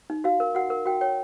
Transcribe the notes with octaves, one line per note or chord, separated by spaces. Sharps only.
D#4
F#4 F5
A#4
F#4 F#5
A#4
F#4 G5
C#5 G5